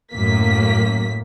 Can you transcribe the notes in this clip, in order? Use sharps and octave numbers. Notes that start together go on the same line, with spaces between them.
F#2 A2 A#3 B6